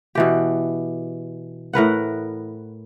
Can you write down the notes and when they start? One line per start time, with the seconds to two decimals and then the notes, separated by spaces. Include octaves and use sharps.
0.15 B2 E3 G4
1.73 A2 A#4 B4 F#5